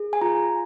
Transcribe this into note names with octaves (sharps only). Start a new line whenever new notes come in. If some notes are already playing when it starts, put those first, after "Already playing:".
Already playing: G#4
G#5
F4 A#5